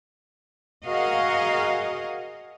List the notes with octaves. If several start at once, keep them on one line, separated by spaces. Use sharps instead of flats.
F#4 G#4 A#4 D#5 F5